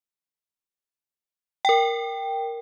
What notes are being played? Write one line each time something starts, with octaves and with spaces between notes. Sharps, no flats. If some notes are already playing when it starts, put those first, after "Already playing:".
A#4 G5